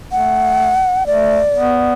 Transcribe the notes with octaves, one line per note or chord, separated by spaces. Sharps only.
A3 F#5
A3 D5
B3